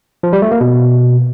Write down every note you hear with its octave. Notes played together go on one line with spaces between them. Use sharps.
F3
G3
A3
A#3
B2